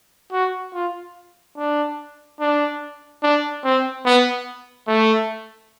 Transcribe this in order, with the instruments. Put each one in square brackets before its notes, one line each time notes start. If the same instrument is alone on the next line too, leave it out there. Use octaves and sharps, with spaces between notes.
[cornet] F#4
F4
D4
D4
D4
C4
B3
A3